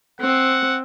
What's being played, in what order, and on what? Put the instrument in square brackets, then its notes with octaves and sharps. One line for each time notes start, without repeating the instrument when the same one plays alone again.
[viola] C4 [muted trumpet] F#5